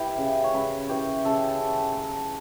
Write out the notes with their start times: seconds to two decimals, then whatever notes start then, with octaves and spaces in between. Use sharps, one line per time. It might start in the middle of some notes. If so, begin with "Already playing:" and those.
Already playing: E3 E4 G4
0.18 C#3
0.44 C#5
0.54 C#3 B4
0.89 E3 G4
1.24 C#3 A4
1.60 C#3
1.96 F#3